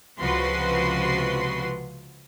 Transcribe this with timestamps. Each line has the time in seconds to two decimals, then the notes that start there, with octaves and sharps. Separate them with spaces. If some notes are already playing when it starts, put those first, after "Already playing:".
0.20 C#2 C3 F3 F#4 B4 C6